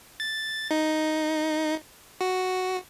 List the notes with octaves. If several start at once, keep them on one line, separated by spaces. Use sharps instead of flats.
A6
D#4
F#4